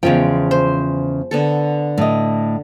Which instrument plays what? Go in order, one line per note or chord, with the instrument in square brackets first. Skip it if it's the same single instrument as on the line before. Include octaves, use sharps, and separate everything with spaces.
[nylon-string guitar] E2 C#3 G5 [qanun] F3 G#3
[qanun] C5
D3 B3 A4
[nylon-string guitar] A2 D#5